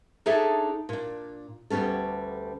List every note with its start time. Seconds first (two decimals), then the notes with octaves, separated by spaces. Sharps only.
0.26 D4 D#4 G#4 A4 C#5 E5
0.89 A#2 D4
1.70 D2 G3 B3 C#4 A4